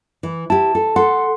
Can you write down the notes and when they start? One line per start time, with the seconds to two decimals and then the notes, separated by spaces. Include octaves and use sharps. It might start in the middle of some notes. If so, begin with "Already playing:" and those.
0.23 E3
0.50 E4 G4 A5
0.75 A4
0.96 A4 F#5 C6